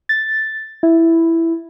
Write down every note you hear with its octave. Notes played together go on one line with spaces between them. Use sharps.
A6
E4